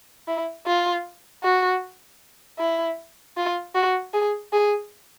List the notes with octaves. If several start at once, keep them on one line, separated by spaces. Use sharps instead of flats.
E4
F4
F#4
E4
F4
F#4
G#4
G#4